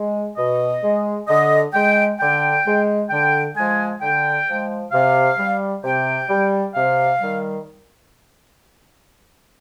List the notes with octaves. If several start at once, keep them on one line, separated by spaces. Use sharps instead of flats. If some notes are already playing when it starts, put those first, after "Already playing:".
Already playing: G#3
B2 D#5
G#3
D3 D#5
G#3 G5
D3 G5
G#3
D3 G5
F3 G#3 G#5
D3 G5
F3 G#3
C3 F5
G3
C3 G5
G3
C3 F5
D#3 G3